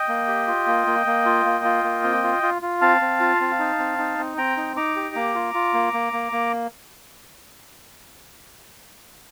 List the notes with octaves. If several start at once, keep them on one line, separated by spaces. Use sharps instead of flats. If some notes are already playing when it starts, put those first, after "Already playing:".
Already playing: D#5 G5
A#3
G4
F4
A#3
A#3
A#3
F4
A#3
F4
A#3
C4
F4
F4
F4
C4 F5 A5
C4
F4
C4
D#4
C4
D#4
C4
C4 G5 A#5
D#4
D#4 A#5 D6
G4
A#3
F4
F4
A#3
A#3
A#3
A#3